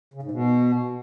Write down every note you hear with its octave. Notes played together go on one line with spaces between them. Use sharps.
C#3
G#2
B2